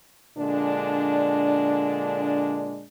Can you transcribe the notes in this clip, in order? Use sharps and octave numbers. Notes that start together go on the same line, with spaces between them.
A#2 D3 G#3 D4